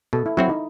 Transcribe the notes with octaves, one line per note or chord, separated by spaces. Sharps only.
B2 A4
E4
F#3 C4 E4 F#4
D#4